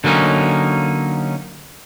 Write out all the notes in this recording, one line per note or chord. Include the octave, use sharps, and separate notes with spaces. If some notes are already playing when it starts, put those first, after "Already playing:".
D3 F#3 A#3 C#4 D#4